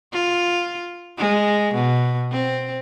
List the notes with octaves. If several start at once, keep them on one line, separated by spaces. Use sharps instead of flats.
F4
G#3
B2
C4